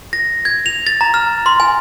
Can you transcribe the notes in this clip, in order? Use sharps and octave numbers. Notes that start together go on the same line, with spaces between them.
A#6
G#6
F7
A6
A#5
F6
C6
G#5